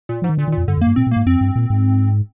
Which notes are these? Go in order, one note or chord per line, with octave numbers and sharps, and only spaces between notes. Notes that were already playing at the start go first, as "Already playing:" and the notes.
A#2
G#2 F3
D#3
A#2 D3
D#3
A#2
F2
G2 D3
F2
G2 A#3
A#2 C4
A#2
G#2 A#3
F2 C4
G2
A#2
G#2